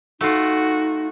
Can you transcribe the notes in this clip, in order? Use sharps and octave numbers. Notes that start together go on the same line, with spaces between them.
A3 D#4 F4 F#4